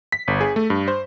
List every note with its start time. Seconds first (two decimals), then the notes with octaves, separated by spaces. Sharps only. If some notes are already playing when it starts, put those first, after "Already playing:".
0.12 B6
0.28 G1
0.41 G#4
0.56 A3
0.70 G2
0.88 C5